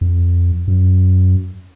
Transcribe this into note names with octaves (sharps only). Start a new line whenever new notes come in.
F2
F#2